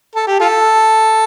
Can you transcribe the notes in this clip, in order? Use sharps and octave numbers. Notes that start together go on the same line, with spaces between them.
A4
G4
F4 A4